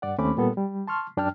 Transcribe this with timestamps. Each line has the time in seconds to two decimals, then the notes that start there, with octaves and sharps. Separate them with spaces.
0.02 G2 D5 F#5
0.18 D#2 A3 C4 C#4 B5 D6
0.37 A#2 G3 B3 A4
0.57 G3
0.87 A5 C6 C#6 F6
1.17 F#2 D4 D5 G5 A5 F6